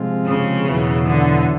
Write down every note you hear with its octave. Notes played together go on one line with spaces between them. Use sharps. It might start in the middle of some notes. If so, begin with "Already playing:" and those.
Already playing: C3 F3 G#3 C4 F4
C#3
E2 B2 F#3 B3 E4
D3